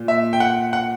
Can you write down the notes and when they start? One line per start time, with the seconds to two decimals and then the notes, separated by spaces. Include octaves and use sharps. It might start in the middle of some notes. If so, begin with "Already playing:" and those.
Already playing: A#2
0.08 E5
0.33 G5
0.40 F#5
0.73 F#5